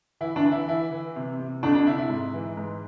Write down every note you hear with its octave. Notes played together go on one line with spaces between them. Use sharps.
E3 E4
D4
E3
E4
E3 E4
E3
C3
C3
F2 D4
D4
C3 E4
E4
G#2
E3
G#2